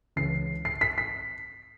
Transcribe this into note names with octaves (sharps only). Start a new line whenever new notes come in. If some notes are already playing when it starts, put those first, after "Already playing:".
C#2 C#3 E3 C7
C7
B6
B6